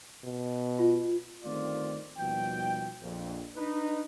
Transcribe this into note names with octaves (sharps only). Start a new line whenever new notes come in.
B2
F4
G1 D#3 A3 C4 F4 D5
D#2 B2 F3 G3 G5
A#1 F2
D4 D#4 B4